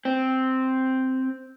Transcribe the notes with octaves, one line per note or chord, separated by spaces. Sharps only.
C4